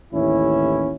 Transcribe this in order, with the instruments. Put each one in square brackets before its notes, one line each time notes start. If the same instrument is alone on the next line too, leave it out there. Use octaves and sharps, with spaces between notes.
[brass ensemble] A1 D#2 C#4 E4